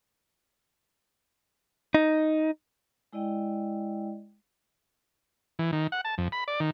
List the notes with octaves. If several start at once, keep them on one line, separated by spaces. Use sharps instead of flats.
D#4
G#3 E4 D5 D#5 G5
E3
D#3
F#5
A5
F2
B5
D5
D#3